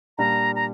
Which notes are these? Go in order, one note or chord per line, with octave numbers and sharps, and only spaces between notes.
A#2 G3 D4 F4 A#5
A#5